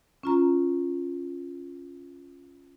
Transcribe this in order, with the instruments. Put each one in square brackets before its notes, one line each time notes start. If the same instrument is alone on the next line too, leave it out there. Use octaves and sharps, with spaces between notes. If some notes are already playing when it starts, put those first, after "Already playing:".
[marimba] C#4 F4 A#5